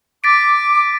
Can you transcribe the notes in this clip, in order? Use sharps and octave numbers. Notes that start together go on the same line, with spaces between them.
D6 A6 B6 D7